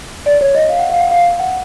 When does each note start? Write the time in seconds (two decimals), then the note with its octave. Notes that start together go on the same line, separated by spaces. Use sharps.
0.26 D5
0.41 C#5
0.55 D#5
0.69 F5
0.79 F#5
0.90 F5
1.01 F#5
1.11 F5
1.40 F#5